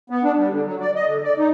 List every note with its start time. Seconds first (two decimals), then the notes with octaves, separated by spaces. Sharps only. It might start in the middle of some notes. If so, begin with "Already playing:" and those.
0.10 B3
0.24 D4
0.37 G3
0.50 D3
0.65 F#3
0.81 D5
0.95 D#5
1.07 D3
1.24 D5
1.38 D#4